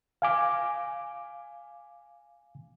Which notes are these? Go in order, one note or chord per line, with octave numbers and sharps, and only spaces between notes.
F5 G#5 D6